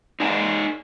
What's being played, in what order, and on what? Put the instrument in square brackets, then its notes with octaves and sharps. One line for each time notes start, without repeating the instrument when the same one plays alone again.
[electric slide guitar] D#4 D5 G#5 A#5